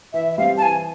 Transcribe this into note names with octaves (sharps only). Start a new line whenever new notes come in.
E3 E5
E5
G3 C4 F5
A5
E3 G#5